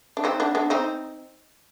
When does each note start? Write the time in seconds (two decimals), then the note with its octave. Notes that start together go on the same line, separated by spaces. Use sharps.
0.17 D4
0.24 C4 D#4
0.40 B3 D4
0.55 B3 D4
0.70 C4 D#4